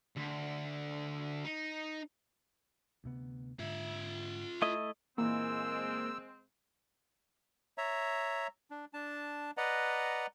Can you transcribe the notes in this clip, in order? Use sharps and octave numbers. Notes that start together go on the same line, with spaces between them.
D2
D#4
D2 C3 B3
G#2 D3 F4 E5
A3 E4 D#5
A#2 E3 G#3 A#3 C4 E6
C#5 E5 A#5
D4
D4 A5
B4 D5 D#5 F#5 A#5